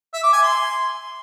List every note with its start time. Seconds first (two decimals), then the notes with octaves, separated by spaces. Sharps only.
0.13 E5
0.23 D6
0.33 G#5
0.43 C6